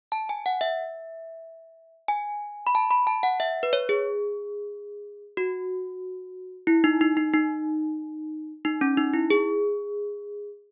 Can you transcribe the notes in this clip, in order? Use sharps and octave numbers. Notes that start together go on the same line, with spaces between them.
A5
G#5
F#5
E5
G#5
B5
A5
B5
A5
F#5
E5
B4
C#5
G#4
F#4
E4
D#4
D#4
D#4
D#4
D#4
C#4
D#4
E4
G#4